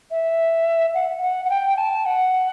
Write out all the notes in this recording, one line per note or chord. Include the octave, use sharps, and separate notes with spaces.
E5
F#5
F#5
F#5
G5
A5
F#5